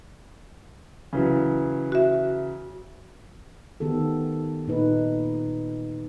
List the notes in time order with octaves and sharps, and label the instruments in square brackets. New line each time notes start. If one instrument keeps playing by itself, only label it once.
[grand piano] C#3 E3 F#3
[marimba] F#4 E5
[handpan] D#3 B3 G4 A4
A#2 D#4 B4